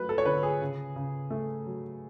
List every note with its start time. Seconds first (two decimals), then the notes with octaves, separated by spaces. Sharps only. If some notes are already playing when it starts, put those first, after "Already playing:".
Already playing: F#3 A3 B4
0.09 A4
0.18 C#5
0.25 D3 B4
0.43 G#4
0.61 C#3
0.96 C#3
1.30 A3
1.67 F#3